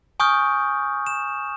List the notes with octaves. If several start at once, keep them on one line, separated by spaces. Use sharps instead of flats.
G#5 C#6 D#6 F6 G6
E7